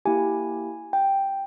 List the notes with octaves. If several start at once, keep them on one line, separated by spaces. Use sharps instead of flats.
A#3 E4 G4 G#5
G5